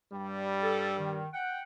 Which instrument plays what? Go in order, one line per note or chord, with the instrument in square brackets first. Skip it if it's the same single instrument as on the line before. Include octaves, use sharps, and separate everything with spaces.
[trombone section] G2 G3
[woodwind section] A4
D#3
F#5 G5